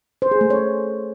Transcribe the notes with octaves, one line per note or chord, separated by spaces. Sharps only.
C5
G#4
A3
C#5